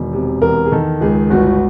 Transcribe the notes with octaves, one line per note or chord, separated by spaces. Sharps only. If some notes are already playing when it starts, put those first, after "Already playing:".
Already playing: E1 D#3
C3
E2 A#4
G#4
D#3 A4
C#2 G#4
G1 F#4